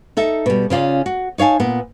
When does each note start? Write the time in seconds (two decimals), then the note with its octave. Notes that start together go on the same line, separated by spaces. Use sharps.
0.17 D#4 A4 E5
0.46 B2 G3
0.70 C#3 C#4 F4 D5
1.06 F#4
1.38 D#4 C#5 F5 G#5 A5
1.60 A#2 B3